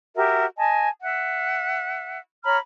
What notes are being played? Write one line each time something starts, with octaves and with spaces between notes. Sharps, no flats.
F#4 G4 A#4 E5
D#5 G#5 A5
E5 F#5
C#5 A#5 B5 F6